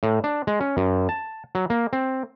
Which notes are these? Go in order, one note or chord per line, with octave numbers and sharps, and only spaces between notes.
A2
D4
G#3
C#4
F#2
A5
F#3
A#3
C4